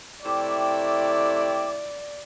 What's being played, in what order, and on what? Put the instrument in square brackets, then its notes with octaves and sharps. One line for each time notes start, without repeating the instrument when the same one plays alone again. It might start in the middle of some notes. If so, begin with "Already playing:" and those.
[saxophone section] C3 A3 E4 [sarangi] D5 [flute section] G5 D6